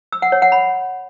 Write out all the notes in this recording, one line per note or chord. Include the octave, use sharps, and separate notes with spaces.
E6
F#5
C#5
F#5
B5